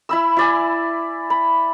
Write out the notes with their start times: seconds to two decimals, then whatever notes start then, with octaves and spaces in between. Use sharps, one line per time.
0.09 E4 B5 E6
0.37 E4 D5 G#5
1.30 B5